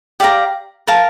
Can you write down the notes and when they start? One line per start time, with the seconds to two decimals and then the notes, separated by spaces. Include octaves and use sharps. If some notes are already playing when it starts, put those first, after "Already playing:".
0.20 G4 D5 F5 A#5
0.87 A#4 F5 A5